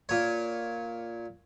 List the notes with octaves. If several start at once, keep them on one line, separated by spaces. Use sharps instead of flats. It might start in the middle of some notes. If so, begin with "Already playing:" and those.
A#2 C#5